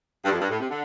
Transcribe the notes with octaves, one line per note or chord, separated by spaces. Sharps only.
G2
F2
G2
A2
C3
D3